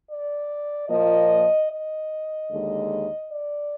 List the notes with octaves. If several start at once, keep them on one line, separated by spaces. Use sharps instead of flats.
D5
A#2 F3 A#3 D#5
D#5
D#2 D3 G#3
D5